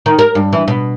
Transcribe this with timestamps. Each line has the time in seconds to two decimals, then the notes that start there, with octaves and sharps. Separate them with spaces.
0.06 D#3
0.19 A#4
0.35 G2
0.53 E3
0.68 B2